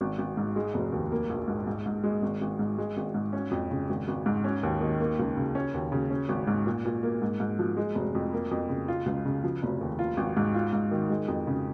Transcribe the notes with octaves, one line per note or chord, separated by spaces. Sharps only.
G#1
G#1
G#2
G#3
F1
D#2
A#3
A#1
G#2
G#2
G#2
G#3
G#1
G#1
G#2
G#3
G#1
G#2
C#4
F2
C#3
G#1
G#1
G#2
C#4
D#2
D#3
A#3
C#2
C#3
C#4
D#2
C#3
C#4
G#1
G#2
A#2
A#2
A#3
G#2
G#2
F3
G#3
F1
F2
A#3
F2
C#3
F4
C#2
C#3
F3
F1
D#2
F4
G#1
G#2
F4
G#2
D#3
G#3
F2
C#3